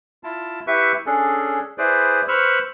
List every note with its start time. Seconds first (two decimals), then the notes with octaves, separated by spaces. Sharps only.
0.24 E4 F4 A5
0.67 E4 G4 B4 E5 C#6
1.06 C#4 D4 G#4 A4
1.78 E4 G#4 B4 C5 D5
2.28 B4 C5 B5 C#6 E6 F6